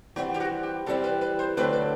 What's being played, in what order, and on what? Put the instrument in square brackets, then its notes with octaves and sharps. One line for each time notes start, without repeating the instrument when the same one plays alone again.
[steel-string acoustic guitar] E3 G3 C4 E4 [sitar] F#4
[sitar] G4
F#4
G4
[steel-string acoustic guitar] E3 G3 C4 E4 [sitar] A4
[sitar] B4
B4
C5
[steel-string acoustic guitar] D2 D3 F#3 A3 C4 [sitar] B4
[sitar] B4